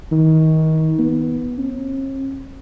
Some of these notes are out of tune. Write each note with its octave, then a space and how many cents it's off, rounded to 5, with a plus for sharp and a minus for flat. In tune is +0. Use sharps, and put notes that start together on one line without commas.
D#3 +30
B3 -5
C#4 -45